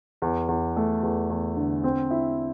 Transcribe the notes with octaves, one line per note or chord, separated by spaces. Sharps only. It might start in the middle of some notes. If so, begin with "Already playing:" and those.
E2
E2
A3
E2
E2
D3
C4
E4